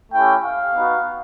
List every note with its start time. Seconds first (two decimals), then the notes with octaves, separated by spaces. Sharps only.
0.13 A3 C#4 E4 G4 G5
0.43 F5
0.74 B3 D#4 F#4